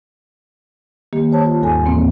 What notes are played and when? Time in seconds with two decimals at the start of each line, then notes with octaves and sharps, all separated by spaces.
1.13 D#3 G3 A#3 G4
1.32 C5 C#5 A5
1.45 F4
1.61 D#2 G#2 G3 A4 G#5
1.83 D#2 A2 E3 A#3 C4